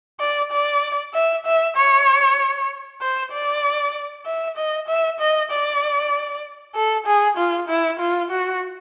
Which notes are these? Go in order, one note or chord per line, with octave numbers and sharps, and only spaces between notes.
D5
D5
E5
E5
C#5
C5
D5
E5
D#5
E5
D#5
D5
A4
G#4
F4
E4
F4
F#4